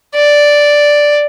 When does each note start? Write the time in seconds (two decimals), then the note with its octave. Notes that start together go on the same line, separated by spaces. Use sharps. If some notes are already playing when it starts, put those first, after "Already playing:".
0.16 D5